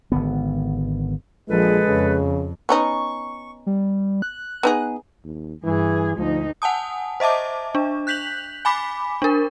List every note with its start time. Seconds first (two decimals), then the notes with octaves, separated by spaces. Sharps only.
0.12 G#1 D3 B3
1.50 A#1 F3 G#3 G#4 A4 B4
1.87 F2 C#3
2.69 B3 C#4 D#4 C#6
3.66 G3
4.22 F#6
4.63 B3 D#4 G#4
5.24 D#2
5.64 G2 E3 G#4
6.17 D2 F3 D#4
6.62 F#5 G#5 A5 D#6
7.20 C5 D#5 E5 A5 D6
7.75 D4
8.07 F#6 G6 B6 F7 F#7
8.65 G#5 B5 D6 B6
9.22 D4 A#4